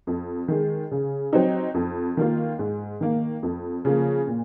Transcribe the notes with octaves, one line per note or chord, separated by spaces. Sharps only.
F2
D#3 G#3
C#3
F#3 C4 D#4
F2
D#3 A#3 F4
G#2
D#3 A#3
F2
C#3 F3 A#3
A#2